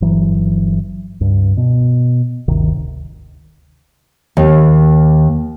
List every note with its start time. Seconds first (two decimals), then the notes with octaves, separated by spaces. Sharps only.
0.01 G1 E3 F#3
1.21 C#2 G2
1.57 B2
2.48 G1 D2 C3 D#3
4.37 D#2